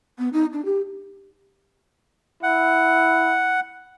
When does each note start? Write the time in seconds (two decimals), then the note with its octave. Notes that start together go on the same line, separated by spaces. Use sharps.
0.19 B3
0.33 D#4
0.53 D4
0.65 G4
2.43 E4 F#5